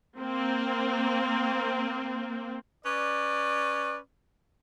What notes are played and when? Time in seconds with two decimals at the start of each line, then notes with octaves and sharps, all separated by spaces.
0.19 A#3 C4
2.84 C#4 B4 D5